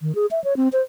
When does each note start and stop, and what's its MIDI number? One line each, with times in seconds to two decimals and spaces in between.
0.01 0.15 51
0.15 0.26 68
0.31 0.42 76
0.44 0.56 73
0.57 0.68 60
0.73 0.82 72